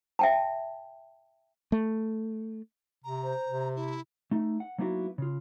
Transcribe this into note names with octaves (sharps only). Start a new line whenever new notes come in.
E5 G5 A5
A3
C3 A#5
C5
C3
E4
A3 D#4
F#5
F#3 A#3 B3 D#4 E4 F#4
C#3 F4